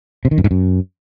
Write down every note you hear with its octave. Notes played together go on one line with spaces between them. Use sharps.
C3
D#3
F#2
G#2
F#2